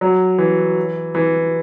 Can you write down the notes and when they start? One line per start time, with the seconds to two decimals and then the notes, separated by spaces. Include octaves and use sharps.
0.01 F#3
0.38 E3
1.15 E3